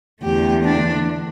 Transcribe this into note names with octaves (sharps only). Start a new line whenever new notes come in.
E2 D3 A3 G4
D4